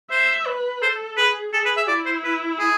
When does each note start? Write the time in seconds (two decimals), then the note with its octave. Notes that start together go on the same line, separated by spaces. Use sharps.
0.11 C5 E5
0.47 B4
0.82 A4 C5
1.17 G#4 B4
1.53 G#4 A4
1.65 B4
1.77 E5
1.88 E4 D5
2.06 C5
2.24 B4
2.59 G#4